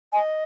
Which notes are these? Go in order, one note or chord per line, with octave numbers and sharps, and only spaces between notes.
D#5 G#5